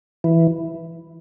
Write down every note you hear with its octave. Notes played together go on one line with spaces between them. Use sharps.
E3